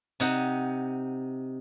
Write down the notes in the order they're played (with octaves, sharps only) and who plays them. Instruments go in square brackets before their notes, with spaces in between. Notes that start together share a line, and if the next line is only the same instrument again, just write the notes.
[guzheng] C3 D#4 F#5